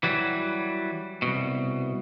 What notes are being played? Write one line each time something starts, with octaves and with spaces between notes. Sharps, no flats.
E3 F#3 G3
C2 F#2 B2